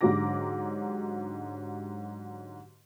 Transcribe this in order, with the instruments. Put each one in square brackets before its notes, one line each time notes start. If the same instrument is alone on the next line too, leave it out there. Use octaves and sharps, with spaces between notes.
[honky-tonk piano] G#2 D3 F#3 G4 D6 A#6